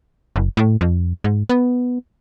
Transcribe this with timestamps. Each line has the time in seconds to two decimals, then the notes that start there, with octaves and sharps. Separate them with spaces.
0.36 F#1
0.57 A2
0.81 F2
1.24 G#2
1.49 B3